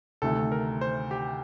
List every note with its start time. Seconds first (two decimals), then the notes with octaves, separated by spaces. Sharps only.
0.22 D2 C3 D#3 A3 A4
0.52 A#4
0.81 C5
1.11 G4